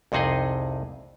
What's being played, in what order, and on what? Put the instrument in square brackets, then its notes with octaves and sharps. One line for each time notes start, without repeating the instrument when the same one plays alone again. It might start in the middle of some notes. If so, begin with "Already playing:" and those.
[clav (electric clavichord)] C2 F2 C3 D#4 G#4 D#5